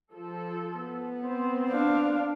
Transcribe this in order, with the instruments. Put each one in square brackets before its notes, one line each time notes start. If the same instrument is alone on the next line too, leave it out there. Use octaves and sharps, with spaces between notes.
[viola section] F3 A4
[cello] B3
[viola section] C4 C5
[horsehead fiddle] D4 F5